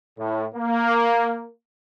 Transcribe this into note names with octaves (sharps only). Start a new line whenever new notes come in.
A2
A#3